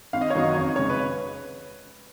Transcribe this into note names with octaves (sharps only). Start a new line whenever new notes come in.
G#1 F5
D#5
C#5
F#2 D#3 F#3 B3 D#5
F2 C#5
C#3 G#3 C#4 C#5
B4